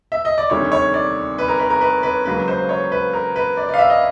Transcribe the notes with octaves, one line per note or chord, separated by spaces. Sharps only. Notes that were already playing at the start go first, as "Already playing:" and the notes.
E5
D#5
D5
D2 C3 D#3 G3 C#5
C#5
D5
B4
A#4
B4
A#4
B4
B4
C#2 C#3 F#3 A#3 B4
C5
C#5
B4
A#4
B4
D5
D5
F5
E5
D#5